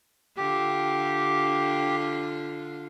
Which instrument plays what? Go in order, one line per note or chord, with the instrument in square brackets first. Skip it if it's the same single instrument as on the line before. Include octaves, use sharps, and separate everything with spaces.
[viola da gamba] D3 F4 [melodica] G4